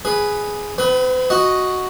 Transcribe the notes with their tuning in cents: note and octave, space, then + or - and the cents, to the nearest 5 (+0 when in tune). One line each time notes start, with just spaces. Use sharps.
G#4 +0 B4 +0
C4 -45 B4 +10
F#4 +0 D#5 +0